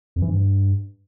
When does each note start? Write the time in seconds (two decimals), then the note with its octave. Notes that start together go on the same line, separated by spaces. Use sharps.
0.16 F2
0.22 E3
0.28 G2